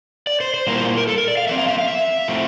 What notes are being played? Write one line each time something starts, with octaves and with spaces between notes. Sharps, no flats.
D5
C5
C5
A#2 G3 A#3 E4 A#4
C5
A#4
A4
A#4
D5
F5
A2 F3 C4 E5
F5
E5
F5
E5
A2 F3 A3 C4